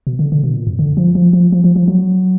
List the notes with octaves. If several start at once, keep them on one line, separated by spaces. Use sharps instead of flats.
B2
D3
D3
B2
A#2
F#2
D3
F3
F3
F3
F3
F3
F3
F#3